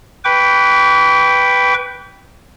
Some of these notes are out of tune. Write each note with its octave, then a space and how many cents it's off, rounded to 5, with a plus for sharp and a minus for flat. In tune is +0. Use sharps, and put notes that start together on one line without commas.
B4 +0 G5 +0 D6 -45